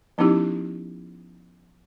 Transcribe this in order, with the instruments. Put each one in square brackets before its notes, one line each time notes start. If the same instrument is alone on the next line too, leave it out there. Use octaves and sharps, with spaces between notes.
[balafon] F3 B3 C#4 D#4 E4 G4